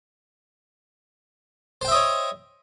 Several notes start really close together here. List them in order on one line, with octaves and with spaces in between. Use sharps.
C5 G5 E5 D#5 C#5